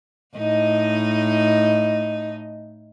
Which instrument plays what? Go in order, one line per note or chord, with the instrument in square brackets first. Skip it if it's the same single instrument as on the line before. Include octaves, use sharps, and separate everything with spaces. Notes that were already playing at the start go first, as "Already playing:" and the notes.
[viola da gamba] A2 D#4 D#5